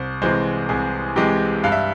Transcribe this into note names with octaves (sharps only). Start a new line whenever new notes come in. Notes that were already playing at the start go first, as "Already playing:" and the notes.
Already playing: C2 C5
C3 E3 G#3 C5
C2 G#4
C3 E3 G#3 G4
G2 F5
E5